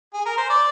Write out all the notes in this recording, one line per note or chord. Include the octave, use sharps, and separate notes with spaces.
G#4
A#4
C5
D5